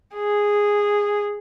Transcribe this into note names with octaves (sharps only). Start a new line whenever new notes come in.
G#4